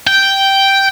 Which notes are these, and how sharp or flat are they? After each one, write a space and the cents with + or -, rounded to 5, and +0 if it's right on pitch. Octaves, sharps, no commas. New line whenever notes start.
G5 -5